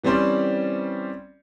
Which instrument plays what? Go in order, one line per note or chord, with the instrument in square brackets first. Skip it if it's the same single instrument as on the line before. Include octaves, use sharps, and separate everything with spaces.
[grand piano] E3 G3 C4 C#4 C5 D5